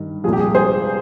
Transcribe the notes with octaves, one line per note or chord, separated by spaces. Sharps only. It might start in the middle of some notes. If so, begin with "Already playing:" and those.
Already playing: G2 D#3
C2 A#2 F3 G#4
G4
G#4
G#4 C5